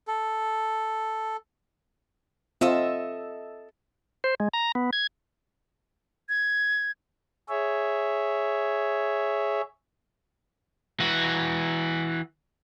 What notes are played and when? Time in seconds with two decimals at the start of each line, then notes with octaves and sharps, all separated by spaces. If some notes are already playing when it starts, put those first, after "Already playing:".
0.08 A4
2.61 C4 F4 A4 D#5 E5
4.24 C5
4.40 G#3
4.54 A#5
4.75 B3
4.93 G#6
6.29 G#6
7.49 G#4 C#5 E5
11.00 E3 F#4